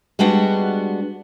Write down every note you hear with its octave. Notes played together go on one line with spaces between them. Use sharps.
G3 G#3 B3 D4 F#4